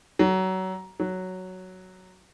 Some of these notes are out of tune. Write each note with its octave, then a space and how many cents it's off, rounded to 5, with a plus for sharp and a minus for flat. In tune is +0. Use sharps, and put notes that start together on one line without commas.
F#3 +25
F#3 +5